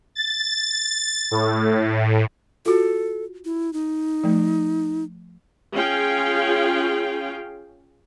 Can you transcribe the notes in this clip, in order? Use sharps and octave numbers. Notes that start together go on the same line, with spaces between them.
A6
A2
F4 F#4 A4
E4
D#4
F3 A3
C#4 F4 G#4 F5 G5